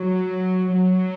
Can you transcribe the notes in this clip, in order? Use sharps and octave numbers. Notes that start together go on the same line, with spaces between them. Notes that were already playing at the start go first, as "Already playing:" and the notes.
Already playing: F#3
F#3